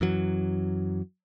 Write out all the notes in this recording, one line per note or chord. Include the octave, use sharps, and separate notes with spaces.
F#2 E3 F#3